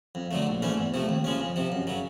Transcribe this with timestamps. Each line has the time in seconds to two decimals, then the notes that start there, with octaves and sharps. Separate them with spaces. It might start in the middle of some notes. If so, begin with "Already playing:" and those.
0.15 F2
0.31 D3 F#3 A3
0.47 A#1
0.62 G#2 E3 A3 C#4
0.78 E2
0.94 C3 F3 A3
1.09 D#2
1.24 C#3 F3 G#3 C#4
1.40 F2
1.56 C3 F3
1.72 F#2
1.87 C#3 F#3